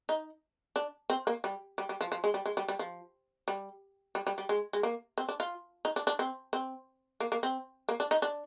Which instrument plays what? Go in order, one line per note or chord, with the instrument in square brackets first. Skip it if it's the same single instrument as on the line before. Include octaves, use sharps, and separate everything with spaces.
[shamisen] D#4
D4
C4
A#3
G3
G3
G3
F3
F3
G#3
G3
G#3
G3
G3
F3
G3
G3
G3
G3
G#3
G#3
A#3
C4
D4
F4
D#4
D4
D4
C4
C4
A#3
A#3
C4
A#3
D4
D#4
D4